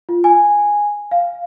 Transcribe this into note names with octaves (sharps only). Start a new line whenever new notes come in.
F4
G#5
F5